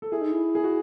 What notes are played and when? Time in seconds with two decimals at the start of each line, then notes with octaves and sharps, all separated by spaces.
0.02 A4
0.12 E4 G#4
0.21 D#4
0.32 E4
0.55 G#4
0.64 F#4